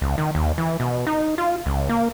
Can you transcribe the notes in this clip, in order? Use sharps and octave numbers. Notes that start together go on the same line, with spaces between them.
C#2
D#3
D#2
E3
B2
D#4
F4
C#2
A#3